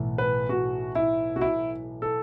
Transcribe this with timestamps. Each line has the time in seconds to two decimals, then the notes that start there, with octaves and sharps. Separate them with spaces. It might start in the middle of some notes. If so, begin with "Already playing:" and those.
Already playing: B1 A2 E3
0.18 B4
0.49 F#4
0.95 E4
1.36 F#4
1.41 E4
2.02 A4